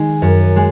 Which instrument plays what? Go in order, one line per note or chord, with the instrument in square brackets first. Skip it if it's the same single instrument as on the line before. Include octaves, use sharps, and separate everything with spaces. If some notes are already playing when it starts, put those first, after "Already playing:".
Already playing: [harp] D#3 G#3 D#4
F#2
G#3